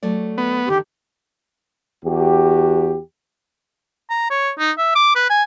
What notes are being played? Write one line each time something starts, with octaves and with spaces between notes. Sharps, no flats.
F#3 A3 D5
B3
D3 D#3 G4
E2 F#4 G4
A#5
C#5
D#4
E5
D6
B4
G#5